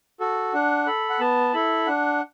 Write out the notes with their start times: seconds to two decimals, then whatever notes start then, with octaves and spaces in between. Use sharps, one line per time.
0.20 F#4 A4
0.54 D4 F#5
0.87 A4 B5
1.10 F#5
1.20 B3 A5
1.54 E4 A4 B5
1.87 D4 F#5